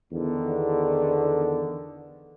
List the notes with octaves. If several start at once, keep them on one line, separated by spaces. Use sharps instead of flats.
E2 D3 D#3